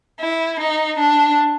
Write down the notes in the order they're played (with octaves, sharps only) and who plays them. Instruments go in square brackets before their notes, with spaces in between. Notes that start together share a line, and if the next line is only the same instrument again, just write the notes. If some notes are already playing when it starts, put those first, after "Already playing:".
[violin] E4
D#4
D4